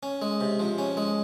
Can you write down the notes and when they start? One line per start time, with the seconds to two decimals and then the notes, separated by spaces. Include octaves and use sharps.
0.03 C#4
0.22 G#3
0.41 C3
0.59 F3
0.78 C#4
0.97 G#3